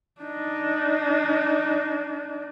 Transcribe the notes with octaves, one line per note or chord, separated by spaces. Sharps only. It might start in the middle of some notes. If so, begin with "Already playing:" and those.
D4 D#4